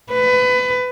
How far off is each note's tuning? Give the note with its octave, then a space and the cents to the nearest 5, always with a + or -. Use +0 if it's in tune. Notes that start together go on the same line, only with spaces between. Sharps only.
B4 +25